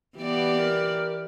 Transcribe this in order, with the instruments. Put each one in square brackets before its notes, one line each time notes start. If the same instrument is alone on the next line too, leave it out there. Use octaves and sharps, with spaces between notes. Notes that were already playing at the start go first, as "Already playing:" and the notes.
[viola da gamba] E3 G4 D5 [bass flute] B3
[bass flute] A#4